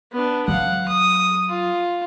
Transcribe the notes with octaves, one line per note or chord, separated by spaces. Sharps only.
B3 D4
F#3 F5 F#5
D#6
F4